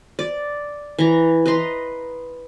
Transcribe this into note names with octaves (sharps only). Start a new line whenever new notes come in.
D5
E3 A#5
B4 D#5 A#5 C6